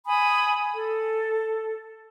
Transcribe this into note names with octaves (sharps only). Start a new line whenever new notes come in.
G#5 B5 D#6
A4